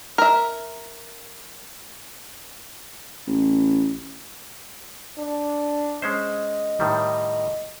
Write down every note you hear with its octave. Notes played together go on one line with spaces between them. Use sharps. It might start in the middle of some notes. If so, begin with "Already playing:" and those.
A#4 E5
A1
D4
G#3 C#4 C5 D#5
A2 D#3 G3